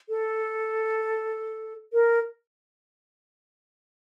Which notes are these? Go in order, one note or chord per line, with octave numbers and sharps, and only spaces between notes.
A4
A#4